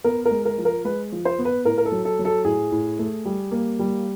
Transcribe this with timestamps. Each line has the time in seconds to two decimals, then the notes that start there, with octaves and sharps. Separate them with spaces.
0.04 B3 A#4
0.25 A#4
0.31 G#3
0.45 A#4
0.58 F3
0.65 A#4
0.85 G#3 B4
1.12 F3
1.25 C5
1.39 B3
1.45 B4
1.65 A2 A#4
1.78 A#4
1.85 A4
1.92 F#3
2.05 A4
2.19 F#3
2.25 A4
2.45 A2 G#4
2.72 A2
2.99 A3
3.25 G3
3.51 A#3
3.79 G3